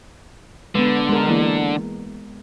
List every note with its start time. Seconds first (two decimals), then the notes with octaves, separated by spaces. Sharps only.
0.75 D3 G#3 B3 B4
1.09 G#3 A#4 C6
1.28 E3 A#3 E4